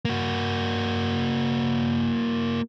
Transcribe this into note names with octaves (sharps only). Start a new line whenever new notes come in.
A#3 F#4